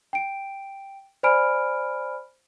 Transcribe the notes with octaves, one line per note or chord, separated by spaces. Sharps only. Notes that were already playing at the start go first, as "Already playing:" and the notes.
G5 D7
C5 D5 G#5 B5 F6 D7